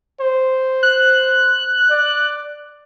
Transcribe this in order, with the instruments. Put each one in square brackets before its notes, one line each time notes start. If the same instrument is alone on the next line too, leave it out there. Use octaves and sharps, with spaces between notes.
[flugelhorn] C5
[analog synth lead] F#6
[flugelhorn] D5